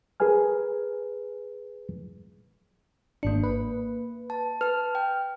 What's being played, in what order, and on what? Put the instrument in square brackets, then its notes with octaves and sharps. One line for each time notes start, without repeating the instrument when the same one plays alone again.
[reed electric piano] G#4 A#4 B4 G#5 F6
[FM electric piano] G#1 D4 [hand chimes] A#3 C#7
[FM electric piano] B4
[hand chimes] A5
[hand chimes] B4 A5 [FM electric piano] F6
[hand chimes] G5